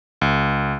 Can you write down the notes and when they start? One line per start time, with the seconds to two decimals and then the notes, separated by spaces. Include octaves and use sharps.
0.21 C#2